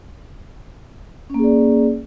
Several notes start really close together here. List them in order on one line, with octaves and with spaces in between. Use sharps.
C#4 A#3 G#4 D5